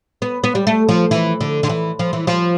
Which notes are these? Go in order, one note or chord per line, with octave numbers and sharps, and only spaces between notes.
B3
B3
G3
A3
F3
E3
D3
D3
E3
F3
E3
F3